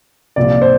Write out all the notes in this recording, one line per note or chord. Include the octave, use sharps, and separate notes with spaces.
C2 A#2 F3 D5
C5